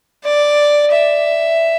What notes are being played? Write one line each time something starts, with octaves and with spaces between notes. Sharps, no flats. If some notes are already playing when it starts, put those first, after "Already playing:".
D5
E5